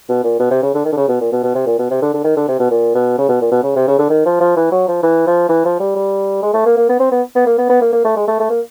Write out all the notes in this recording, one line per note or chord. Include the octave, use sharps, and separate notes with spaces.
B2
A#2
B2
C3
C#3
D3
D#3
D3
C#3
B2
A#2
B2
B2
C3
A#2
B2
C3
D3
D3
D#3
D3
C3
B2
A#2
B2
C#3
B2
A#2
B2
C#3
C3
C#3
D3
D#3
F3
F3
E3
F#3
F3
E3
F3
E3
F3
G3
G3
G#3
A3
A#3
A#3
B3
C4
B3
B3
A#3
B3
B3
A#3
A#3
A3
G#3
A3
A3
A#3